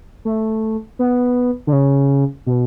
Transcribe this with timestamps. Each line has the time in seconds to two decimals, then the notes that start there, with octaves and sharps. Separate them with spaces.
0.25 A3
0.99 B3
1.67 D3
1.73 C#3
2.47 B2